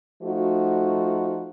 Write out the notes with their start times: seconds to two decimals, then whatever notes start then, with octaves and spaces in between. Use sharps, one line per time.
0.23 F3 A3 D#4 F#4